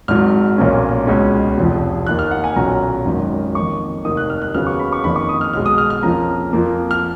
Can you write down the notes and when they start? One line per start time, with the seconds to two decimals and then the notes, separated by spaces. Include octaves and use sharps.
0.08 G#1 G#2 F#3 F6
0.58 B1 A#2 F3 A#3 C#4
1.07 C#2 B2 G#3 C#4
1.57 F1 F2 F3
2.07 D#2 D#3 A#3 F#6
2.19 F6
2.31 F#5
2.44 G#5
2.56 B1 A#2 F#3 C#4 A#5
3.05 G#1 F#2 D#3
3.55 F#1 F2 D#3 C#6
4.05 F1 D#2 D#3 D#6
4.17 F#6
4.30 F6
4.42 F#6
4.54 D#2 C#3 F#3 B3 F6
4.67 C#6
4.79 B5
4.93 C#6
5.04 F#1 F2 D#3 B5
5.16 C#6
5.29 D#6
5.41 F6
5.53 B1 B2 G#3 F6
5.66 D#6
5.78 F6
5.90 F6
6.03 F2 F3 A#3 C#4 A#5
6.53 F2 F3 A#3
6.91 F6